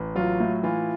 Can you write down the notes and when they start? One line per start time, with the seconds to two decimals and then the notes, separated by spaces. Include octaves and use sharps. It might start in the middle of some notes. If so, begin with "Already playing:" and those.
Already playing: A1
0.15 F#3 F4
0.40 A2
0.63 E3 F4